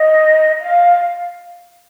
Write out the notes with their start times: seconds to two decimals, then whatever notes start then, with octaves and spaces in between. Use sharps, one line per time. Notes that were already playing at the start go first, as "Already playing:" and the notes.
Already playing: D#5
0.61 F5